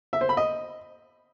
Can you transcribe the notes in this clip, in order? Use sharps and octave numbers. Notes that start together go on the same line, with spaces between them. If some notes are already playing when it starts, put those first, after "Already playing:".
E5
C5
B5
D#5